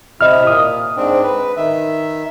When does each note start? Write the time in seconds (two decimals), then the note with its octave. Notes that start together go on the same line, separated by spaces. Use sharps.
0.21 C3 E4 D#5 F6
0.47 A#2 D#6
0.97 G#2 C4 D4
1.23 B4
1.57 D#3 E5